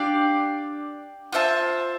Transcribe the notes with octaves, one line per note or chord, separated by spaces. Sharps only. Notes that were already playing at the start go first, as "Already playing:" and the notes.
Already playing: D4 G4 D5 F5
F4 C5 E5 A5